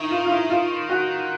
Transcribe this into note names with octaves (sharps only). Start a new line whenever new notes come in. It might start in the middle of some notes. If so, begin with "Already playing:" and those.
Already playing: D#3 D#4 E4
F4
F4
E4
F4
F#4